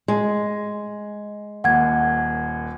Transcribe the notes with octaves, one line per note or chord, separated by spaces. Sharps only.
G#3
D#1 D#2 F#5 G#6